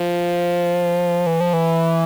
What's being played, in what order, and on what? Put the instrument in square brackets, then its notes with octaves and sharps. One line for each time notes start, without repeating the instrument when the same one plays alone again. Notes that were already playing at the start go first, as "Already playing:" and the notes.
Already playing: [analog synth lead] F3
E3
F3
E3